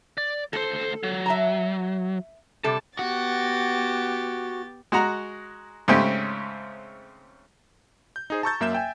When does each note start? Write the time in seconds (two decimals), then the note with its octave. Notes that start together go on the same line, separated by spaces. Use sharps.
0.18 D5
0.53 D2 A4 C5
1.03 F#3
1.26 E5 A5 A#5
2.64 C3 G3 A4 A5
2.99 B3 F#4 G4 A6
4.92 G#3 F#4 F#5 A#5
5.88 G#2 C#3 A3 C4 C#4 G4
8.16 G6
8.30 D#4 G#4 C5
8.43 A5 A#5 C#6 E6 G6 A6
8.61 F#2 A#3 E5 G6 E7
8.73 E5 G5 G#5